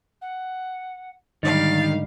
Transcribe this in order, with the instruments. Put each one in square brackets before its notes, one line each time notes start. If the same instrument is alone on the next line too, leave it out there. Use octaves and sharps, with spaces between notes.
[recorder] F#5
[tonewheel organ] G#2 D3 D#4 [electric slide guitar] D#3 [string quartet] G3 F5 [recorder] A6